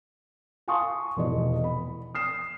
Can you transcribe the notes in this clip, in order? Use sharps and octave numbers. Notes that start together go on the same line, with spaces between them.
F5 G#5 A5 C6 C#6 D#6
F1 E2 B2 D#5
B5
D#6 F6 C7 E7